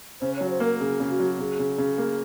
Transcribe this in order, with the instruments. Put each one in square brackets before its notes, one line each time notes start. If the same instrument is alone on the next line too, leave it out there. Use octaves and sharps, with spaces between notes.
[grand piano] C#3 [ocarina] C5
[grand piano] F#3 [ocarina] C#5
[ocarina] C5
[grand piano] A#3
[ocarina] A#4
[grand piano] C#3 [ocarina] G#4
[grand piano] C#3
[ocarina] F#4
[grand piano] F#3
[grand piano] C#3 [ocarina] G#4
[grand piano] C#3
C#3
A#3